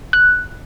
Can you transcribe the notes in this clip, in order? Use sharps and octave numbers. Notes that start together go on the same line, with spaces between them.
F#6